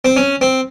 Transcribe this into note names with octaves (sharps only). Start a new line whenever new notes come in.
C4
C#4
C4